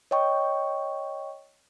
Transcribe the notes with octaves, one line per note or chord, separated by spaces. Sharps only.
C#5 D#5 G5 C#6